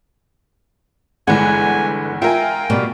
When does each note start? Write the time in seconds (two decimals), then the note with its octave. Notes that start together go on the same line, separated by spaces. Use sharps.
1.27 G1 D3 E3 G#3 F#5 G#5
2.22 F4 A#4 E5 G5 G#5
2.70 B2 G3 A#3